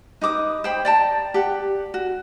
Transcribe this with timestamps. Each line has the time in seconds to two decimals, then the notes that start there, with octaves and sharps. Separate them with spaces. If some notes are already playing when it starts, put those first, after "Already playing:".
0.21 D#4 B4 D6 D#6
0.64 C5 G5 B5
0.85 D5 G5 A5 A#5
1.34 G4 F#5
1.94 F#4